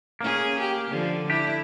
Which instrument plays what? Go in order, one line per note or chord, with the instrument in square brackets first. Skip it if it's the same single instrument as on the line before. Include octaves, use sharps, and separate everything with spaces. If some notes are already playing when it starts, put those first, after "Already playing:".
[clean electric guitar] A#3 [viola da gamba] C#4 G#4
[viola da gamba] G4
D3 F3
[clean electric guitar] D4 G4 [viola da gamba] E4